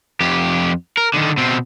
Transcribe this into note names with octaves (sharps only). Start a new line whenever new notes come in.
F2 G4
A#4
D3 D#3
B2 C4